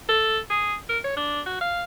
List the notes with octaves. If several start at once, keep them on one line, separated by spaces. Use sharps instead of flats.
A4
G#4
A#4
C#5
D4
F#4
F5